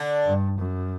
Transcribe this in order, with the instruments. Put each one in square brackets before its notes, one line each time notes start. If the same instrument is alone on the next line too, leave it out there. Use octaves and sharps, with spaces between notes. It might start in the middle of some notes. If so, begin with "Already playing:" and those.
Already playing: [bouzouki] D3 D4
[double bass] G2
F#2